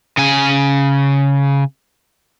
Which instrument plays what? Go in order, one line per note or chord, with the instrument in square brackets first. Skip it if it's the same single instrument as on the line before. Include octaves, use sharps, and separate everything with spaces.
[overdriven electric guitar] C#3 G#5